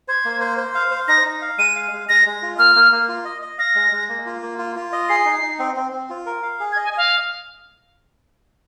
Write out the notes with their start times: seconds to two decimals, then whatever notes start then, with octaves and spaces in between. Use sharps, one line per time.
0.08 C5 G#6
0.25 A#3
0.41 C5
0.58 C5
0.75 F5
0.91 C5
1.08 D#4 A#6
1.25 D#4
1.42 F5
1.58 G#3 D#7
1.76 F5
1.92 G#3
2.09 G#3 A#6
2.26 G#3
2.42 F4
2.58 A#3 F6
2.76 A#3
2.92 A#3
3.09 F4
3.25 D#5
3.42 D#5
3.58 F5 A#6
3.75 G#3
3.92 G#3
4.09 A#3
4.26 F4
4.42 A#3
4.58 F4
4.76 F4
4.92 D#5
5.09 G#4 C7
5.25 D#4
5.42 D#4
5.59 C4
5.76 C4
5.93 C4
6.10 F4
6.26 A#4
6.43 F5
6.60 G#4
6.72 G#6
6.76 D#5
6.84 G#5
6.92 D#5 F5